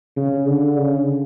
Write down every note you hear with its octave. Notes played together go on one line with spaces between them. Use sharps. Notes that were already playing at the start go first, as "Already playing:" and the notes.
C#3
D3
C#3